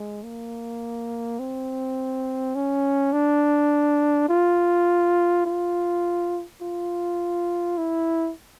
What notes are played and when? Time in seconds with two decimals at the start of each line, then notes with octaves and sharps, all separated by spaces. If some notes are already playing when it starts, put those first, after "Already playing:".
Already playing: G#3
0.23 A#3
1.39 C4
2.55 C#4
3.13 D4
4.29 F4
5.46 F4
6.62 F4
7.78 E4